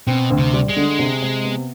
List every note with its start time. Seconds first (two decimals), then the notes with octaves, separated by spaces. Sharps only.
0.07 B2 C4
0.30 D2
0.38 C3
0.53 G3
0.69 G#3
0.76 D3
0.99 C3
1.22 C3
1.45 B3